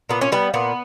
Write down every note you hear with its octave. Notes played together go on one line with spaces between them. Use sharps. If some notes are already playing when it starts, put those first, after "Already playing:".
A#2 B3
C#4
G3 B3
A#2 B3